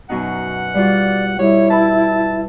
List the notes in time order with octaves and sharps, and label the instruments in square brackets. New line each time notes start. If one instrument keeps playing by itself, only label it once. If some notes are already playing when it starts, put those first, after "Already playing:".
[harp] F#2 B2 D#4 [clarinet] F#5
[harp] G3 F4 F#4 [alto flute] D5
[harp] G3 [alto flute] E4 [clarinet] C#5
[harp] B4 B5 [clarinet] A5